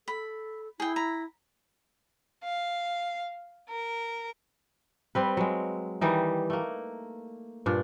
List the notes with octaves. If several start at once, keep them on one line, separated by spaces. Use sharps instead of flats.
A4 B5
E4 G#4 G5
A#5 B5
F5
A#4
G3 C4 B4
F#3 G#3
D#3 E3 G3 D#4
A3 A#3
G2 A#2 D4